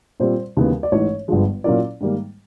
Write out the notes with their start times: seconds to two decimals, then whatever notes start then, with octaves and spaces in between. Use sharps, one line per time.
0.20 A#2 G3 C4 F4 C5
0.57 D#2 C#3 E3 G#3 B3
0.83 D5
0.92 A1 G#2 E3 C#5
1.28 G1 G2 D3 F3 G#3
1.64 A#2 F#3 A#3 C#4 E4 D5
2.01 G#2 D#3 G3 A#3